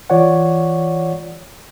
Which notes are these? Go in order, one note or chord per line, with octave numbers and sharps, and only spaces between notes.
E3 F4 C#5 D5 F#5